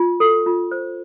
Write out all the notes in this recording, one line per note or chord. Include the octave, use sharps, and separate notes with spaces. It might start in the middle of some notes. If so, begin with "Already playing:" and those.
Already playing: F4
A4
F4
C5